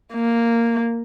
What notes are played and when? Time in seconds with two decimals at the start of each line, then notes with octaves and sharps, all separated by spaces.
0.14 A#3